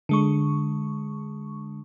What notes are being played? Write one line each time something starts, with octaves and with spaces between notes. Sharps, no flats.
D3 G#3 C#6